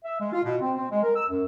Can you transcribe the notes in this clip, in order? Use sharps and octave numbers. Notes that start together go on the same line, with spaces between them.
E5
G#3
F4
B2
C4
C4
G#3
A#4
E6
F#2